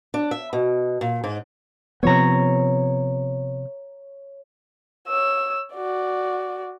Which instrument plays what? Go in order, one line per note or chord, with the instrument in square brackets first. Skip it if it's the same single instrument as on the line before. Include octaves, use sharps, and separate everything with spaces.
[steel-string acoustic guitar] D4
E5
B2
A#2
G#2
[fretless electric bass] C3 F3 B3 [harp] C#5 A#5
[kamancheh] C#5 E6
F#4 D5